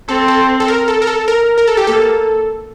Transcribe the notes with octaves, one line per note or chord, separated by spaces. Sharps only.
C4 A4
A4
A4
A#4
A4
A#4
A4
A#4
A#4
A4
G4
A#3 A4